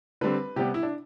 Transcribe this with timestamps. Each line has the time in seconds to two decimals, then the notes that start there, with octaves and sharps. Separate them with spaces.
0.21 D3 G3 C4 B4
0.56 C3 G3 B3 G4
0.74 E4
0.83 D4